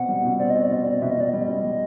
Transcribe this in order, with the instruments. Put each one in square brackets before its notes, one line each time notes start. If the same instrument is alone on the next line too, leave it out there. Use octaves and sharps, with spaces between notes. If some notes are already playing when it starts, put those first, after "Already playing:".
Already playing: [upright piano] B2 C4 [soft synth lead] F#5
[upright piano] G3
B2
[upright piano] C4 [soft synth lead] D5
[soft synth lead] D#5
[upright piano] C4
[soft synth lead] D5
[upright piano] B2 [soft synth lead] D#5
[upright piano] C4 [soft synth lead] D5
[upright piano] B2 [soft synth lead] E5
[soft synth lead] D#5
[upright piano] B2 [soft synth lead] D5
[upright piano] G3 [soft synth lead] D#5
[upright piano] B2
G3